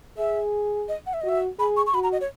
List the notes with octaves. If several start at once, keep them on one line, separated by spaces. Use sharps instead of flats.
G#4 E5
D#5
F#5
E5
D#5
F#4 E5
G#4 B5
C#6
C#6
F#4 B5
A#5
D#5
C#5